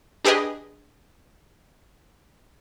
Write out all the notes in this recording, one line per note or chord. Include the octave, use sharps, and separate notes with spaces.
D4 G4 G#4 B4 D#5